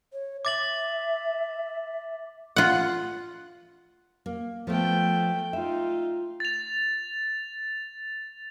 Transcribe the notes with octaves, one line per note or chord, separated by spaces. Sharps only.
C#5
E5 D6 A6 F#7
F4 F#5
A#3
F3 A3 B3 G5
D#4 F4 E5
A6 F7